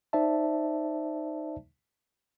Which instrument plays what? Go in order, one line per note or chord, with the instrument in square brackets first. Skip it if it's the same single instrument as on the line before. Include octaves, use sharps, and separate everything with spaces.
[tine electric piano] D#4 C5 D5 E5 A5